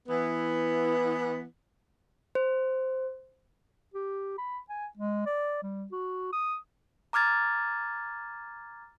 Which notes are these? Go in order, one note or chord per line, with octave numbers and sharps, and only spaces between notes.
E3 B3
C5
G4
B5
G#5
G#3
D5
G3
F#4
D#6
A#5 D6 F6 G#6 A6